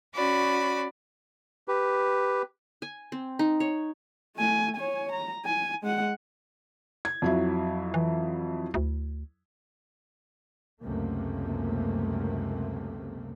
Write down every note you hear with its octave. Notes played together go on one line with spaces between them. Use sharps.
C#4 F#4 D5 B5
G4 B4
G#5
C4
D#4
C#5
A3 G#5
C#5 G#5
A#5
G#5
G#3 F#5
G#6
F2 F#3 E4
E3
D2
C#2 F#2 C3 A3 A#3